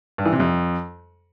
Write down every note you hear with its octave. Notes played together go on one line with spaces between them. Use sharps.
G2
E3
C3
F2